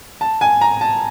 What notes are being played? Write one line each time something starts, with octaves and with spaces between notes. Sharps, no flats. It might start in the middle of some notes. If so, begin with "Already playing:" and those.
A5
G#5
A#5
A5